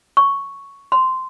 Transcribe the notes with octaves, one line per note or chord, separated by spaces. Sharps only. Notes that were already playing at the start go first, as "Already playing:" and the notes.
C#6
C6